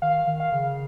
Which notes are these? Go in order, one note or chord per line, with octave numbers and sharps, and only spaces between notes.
D#3 F5
D#3
F5
C#3